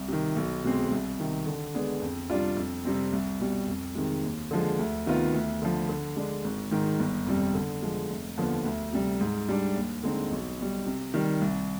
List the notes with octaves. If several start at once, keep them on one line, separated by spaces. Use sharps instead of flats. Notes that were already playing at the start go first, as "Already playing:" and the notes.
Already playing: C2
C3 D#3
B1
B2 G#3 C4
C2
C3 D#3
D3
G#3 B3 D4 G#4
F2
C3 G3 D4 F4
F2
C3 G3 C4
C2
B2 G3
F2
C3 D#3 G#3
D#2
D3 F3 G#3
D2
C3 D#3 B3 F4
D2
D3 F3
D3
G#3 D4
G#1
G#2 D#3
G1
F2 C3 G3
D3
F3 G#3
F1
D#2 D3 F3 B3
D2
C3 G3
G#2
G3 D4
D#2
D3 G#3 C4 D#4
B1
B2 G3
C3
D#3 G3
C2